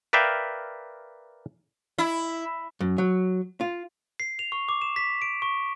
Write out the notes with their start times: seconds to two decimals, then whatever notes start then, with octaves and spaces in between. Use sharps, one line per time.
0.13 A#4 B4 D5 E5 F5 G5
1.98 E4
2.80 F#2
2.98 F#3
3.61 F4
4.20 C7
4.39 F7
4.52 C#6
4.69 D6
4.82 E7
4.96 B6
5.22 D7
5.42 C#6